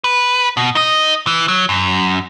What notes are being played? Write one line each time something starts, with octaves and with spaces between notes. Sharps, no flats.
B4
B2
D#4 D#5
E3
F#3
F#2